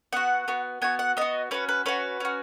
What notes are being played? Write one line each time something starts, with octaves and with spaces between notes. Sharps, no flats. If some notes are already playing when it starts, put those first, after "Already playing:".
B3 F#4 F#5
B3 F#4
B3 F#4 G#5
F#5
B3 F#4 D#5
C#4 F#4 B4
B4
C#4 F#4 B4
C#4 F#4